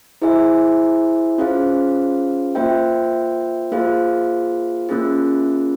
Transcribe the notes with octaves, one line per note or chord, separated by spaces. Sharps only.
E4 G#4 C5 E5 G#5
C#4 F4 G#4 C5 F5
A#3 F4 C5 E5 G5
A#3 F4 G#4 C5 F5
A#3 C#4 F4 G#4